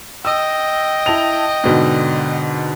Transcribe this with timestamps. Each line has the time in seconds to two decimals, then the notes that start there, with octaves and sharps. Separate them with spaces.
0.25 D#5 G5 E6
1.06 E4 A5 F7
1.64 G#2 B2 D3